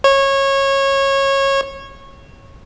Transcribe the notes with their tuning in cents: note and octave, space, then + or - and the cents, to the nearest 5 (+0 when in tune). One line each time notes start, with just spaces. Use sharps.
C#5 -20